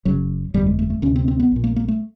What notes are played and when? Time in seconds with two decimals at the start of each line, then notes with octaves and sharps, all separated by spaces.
0.05 F#1 F#2 C#3 F#3
0.54 G1 F2 D3 G3
0.66 G#3
0.79 A3
0.90 A3
1.02 D2 C3 C#4
1.16 C4
1.28 C4
1.40 B3
1.52 A#1 A#2
1.64 A#3
1.76 A#3
1.88 A3